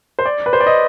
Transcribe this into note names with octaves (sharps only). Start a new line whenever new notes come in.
C5
D5
B4
C5
D5
D#5